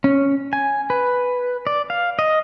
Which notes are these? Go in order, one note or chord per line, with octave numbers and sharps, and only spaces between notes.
C#4
G#5
B4
D5
F5
D#5